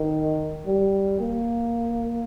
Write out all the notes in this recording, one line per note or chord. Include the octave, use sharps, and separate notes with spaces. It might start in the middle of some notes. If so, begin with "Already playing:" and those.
Already playing: D#3
G3
A#3